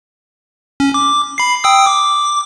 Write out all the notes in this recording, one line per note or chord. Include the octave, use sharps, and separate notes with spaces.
C#4
D6
B5 C7
G5 D#6 E6
D6